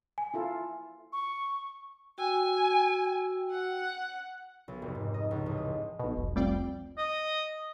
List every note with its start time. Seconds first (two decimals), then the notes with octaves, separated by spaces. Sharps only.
0.18 G#5
0.34 E4 F4 A4
1.13 C#6
2.18 F#4 G5 G#5 E6
3.50 F#5
4.68 B1
4.82 F1
4.95 G#2
5.14 D#5
5.31 C#2
5.46 A1
5.58 D#6
5.99 B1 B2
6.17 F1 C2 F3
6.36 G3 A3 C4 F4 D5 G5
6.98 D#5